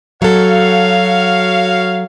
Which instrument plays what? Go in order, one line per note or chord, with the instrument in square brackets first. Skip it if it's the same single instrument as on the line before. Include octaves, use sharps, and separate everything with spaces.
[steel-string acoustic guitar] F#3 A4 [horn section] F#4 C#5 F5